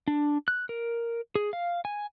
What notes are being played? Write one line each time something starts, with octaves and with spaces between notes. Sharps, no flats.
D4
F#6
A#4
G#4
F5
G#5